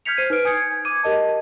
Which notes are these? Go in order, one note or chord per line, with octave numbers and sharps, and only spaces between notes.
F6 G6 G#6 B6 C#7 F7
C5 C7 D#7
D#4 B4 F6 D7
G#5 D#6 G6 G#6 C#7
D6 G#6 D#7
G4 A#4 D#5 A5